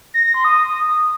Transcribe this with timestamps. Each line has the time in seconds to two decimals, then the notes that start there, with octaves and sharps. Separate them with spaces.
0.14 A#6
0.24 A#6
0.34 C6
0.45 D#6